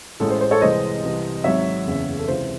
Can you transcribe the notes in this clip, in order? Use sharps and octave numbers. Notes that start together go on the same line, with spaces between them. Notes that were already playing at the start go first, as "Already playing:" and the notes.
A1 A2 G#3 A4
C5
C5
A4 C#5
C2 C3 E3 G#3 C5 D#5
C2 C3 E3
G#1 G#2 F#3 C#5 E5
F#1 E2 C#3
A4
C#2 C3 E3 C5